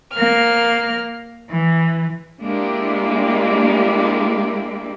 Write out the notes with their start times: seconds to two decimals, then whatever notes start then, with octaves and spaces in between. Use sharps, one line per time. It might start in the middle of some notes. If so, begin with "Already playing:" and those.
0.13 A#3 F6
1.50 E3
2.43 G#3 A#3 D4 E4 G4